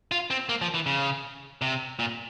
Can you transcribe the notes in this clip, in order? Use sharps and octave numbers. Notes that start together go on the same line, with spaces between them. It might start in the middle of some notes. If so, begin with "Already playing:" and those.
F4
C4
A#3
F3
E3
C#3
C3
A#2